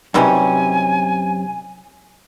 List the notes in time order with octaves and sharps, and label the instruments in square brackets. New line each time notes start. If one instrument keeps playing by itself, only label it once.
[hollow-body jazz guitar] F#2 C3 C#4 [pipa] D#3 E3 G3 [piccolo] G#5